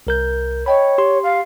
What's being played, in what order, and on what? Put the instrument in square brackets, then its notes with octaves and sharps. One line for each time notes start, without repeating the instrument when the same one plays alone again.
[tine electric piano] C2 A#4 G6
[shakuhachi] C#5 [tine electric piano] D#5 G5 B5
[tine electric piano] G4 C6
[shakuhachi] F5